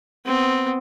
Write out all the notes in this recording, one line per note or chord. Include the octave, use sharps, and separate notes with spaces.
B3 C4